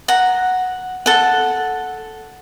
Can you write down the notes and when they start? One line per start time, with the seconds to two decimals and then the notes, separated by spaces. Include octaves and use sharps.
0.08 F#5 A#5
1.06 A4 F#5